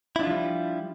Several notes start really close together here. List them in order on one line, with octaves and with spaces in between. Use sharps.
E4 D4 F4 F3 G3